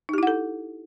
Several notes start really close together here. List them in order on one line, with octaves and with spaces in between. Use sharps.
D#4 G4 E4 F#5 A4